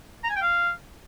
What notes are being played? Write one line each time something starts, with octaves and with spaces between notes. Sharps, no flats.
A#5
G#5
G5
F5